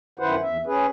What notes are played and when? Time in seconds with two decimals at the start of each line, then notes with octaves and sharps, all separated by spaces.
0.19 F#2 D#3 E4 B4 C5 F#5
0.42 E2 E5
0.66 C#4 G#4 B4